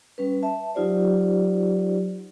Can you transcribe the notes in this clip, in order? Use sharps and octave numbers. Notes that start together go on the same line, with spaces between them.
G3 C#4 B4
E5 A5
F#3 D#4 F4 G4 C5 D5